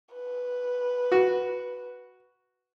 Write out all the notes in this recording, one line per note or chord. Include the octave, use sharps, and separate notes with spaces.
B4
F#4